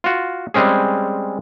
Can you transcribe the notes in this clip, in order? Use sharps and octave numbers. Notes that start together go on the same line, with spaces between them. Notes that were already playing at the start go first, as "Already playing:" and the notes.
F4 F#4
G3 G#3 C4 C#4 G#4